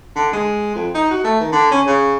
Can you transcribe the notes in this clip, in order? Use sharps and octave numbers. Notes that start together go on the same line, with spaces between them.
D3
G#3
F2
D#4
F#4
A3
D#3
D3
C#4
C#3